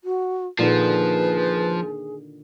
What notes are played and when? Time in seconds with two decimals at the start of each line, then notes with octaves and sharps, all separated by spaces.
0.04 F#4
0.59 A#2 D3 D#3 F3 G#4 B4